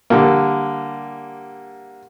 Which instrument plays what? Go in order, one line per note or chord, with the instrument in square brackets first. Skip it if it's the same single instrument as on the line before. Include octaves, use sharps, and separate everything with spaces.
[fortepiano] D3 G3 A#3